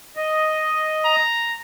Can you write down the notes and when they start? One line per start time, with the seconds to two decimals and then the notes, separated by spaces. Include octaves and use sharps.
0.16 D#5
1.05 A#5